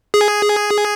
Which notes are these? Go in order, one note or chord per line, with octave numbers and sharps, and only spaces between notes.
G#4